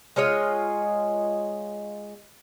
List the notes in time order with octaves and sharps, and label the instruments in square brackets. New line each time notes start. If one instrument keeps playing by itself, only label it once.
[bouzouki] G#3 F4 C#5 D#5